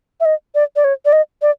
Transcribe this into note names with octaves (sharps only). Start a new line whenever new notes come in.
E5
D#5
D5
D5
C#5
D5
D#5
D5